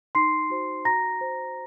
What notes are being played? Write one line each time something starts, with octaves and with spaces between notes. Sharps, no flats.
D#4 C6 C7
F#4 C5
F#4 A#5 A#6
C5